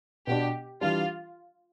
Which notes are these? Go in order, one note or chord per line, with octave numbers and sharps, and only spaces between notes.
B2 B3 D4 G4
E3 G3 D4 F4